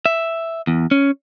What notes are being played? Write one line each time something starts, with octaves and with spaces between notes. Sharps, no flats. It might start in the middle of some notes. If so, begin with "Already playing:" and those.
E5
E2
C#4